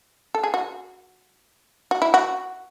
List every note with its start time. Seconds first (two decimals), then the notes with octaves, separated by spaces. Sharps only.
0.35 A4
0.43 G#4
0.54 F#4
1.91 F#4
2.02 E4
2.14 F#4